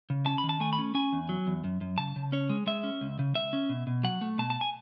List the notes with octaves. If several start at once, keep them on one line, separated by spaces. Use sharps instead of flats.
C#3
C#4 A5
B5
D#3
A5
A3 G#5
B5
C#4
C#4 G#5
E2
F#3
E2
F#2
F#2
C#3 A5
C#3
C#4 C#5
G#3
G#3 E5
C#4
C#2
C#3
C#2 E5
C#4
B2
B2
F#3 F#5
A3
B2 A5
A5
G#5